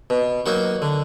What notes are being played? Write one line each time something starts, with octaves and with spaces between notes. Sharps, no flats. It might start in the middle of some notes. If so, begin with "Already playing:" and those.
B2
F#3 A#3 D#4 F#4
D3